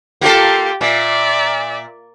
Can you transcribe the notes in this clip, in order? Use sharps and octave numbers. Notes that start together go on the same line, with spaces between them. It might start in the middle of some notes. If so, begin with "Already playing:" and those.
A#3 F4 G4 A4
A#2 D5 E5